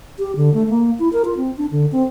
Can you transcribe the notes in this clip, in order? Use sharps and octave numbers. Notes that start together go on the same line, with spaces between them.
G4
D3
A3
A#3
E4
A#4
F4
C4
D4
D3
C4